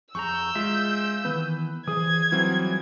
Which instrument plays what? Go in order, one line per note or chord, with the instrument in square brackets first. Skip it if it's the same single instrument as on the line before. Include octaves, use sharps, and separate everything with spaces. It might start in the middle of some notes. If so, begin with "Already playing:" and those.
[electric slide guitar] F2 G#4 A#5 [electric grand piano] C#6 [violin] E6 G6
[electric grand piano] G#3 F4 [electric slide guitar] E5 F5
[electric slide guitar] D#3 E3 B3 [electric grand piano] B4
[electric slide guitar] E3 C5 [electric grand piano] G#4 D#6 [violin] G#6
[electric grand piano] E3 F#3 C4 [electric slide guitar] G3 F4 G#4